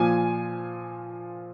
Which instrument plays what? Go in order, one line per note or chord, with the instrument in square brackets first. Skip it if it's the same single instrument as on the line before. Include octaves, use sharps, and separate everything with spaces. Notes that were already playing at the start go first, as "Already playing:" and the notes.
Already playing: [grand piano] A#2 F3 G#5